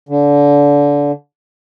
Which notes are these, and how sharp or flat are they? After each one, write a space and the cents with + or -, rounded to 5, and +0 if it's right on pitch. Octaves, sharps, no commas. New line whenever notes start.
D3 -25